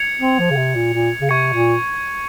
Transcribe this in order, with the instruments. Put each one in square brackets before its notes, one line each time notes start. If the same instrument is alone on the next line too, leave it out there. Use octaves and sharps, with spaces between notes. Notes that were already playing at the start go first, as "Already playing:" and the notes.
Already playing: [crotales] G#6 C#7 F7
[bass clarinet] C4
F3
C#3
C3
A#2
A#2
C#3
[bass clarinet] C3 [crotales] C#6 G#6 C#7
[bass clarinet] A#2